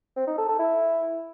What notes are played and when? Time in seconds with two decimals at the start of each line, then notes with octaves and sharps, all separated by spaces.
0.16 C4
0.27 D#4
0.38 A4
0.48 A4
0.59 E4